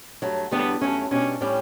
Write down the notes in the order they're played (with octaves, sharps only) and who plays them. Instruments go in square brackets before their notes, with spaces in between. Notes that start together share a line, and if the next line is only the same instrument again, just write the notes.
[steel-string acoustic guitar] G2 F#3 A3
[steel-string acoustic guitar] E2 D3 G3 D4 [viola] B3
[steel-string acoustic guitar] G2 F#3 A3 [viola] C#4
[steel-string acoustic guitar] B2 G3 D4 [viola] C#4
[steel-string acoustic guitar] A2 G3 C#4 G4